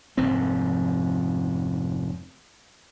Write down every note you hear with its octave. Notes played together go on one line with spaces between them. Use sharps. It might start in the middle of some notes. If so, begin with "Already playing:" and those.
F1 G#2 F3 C4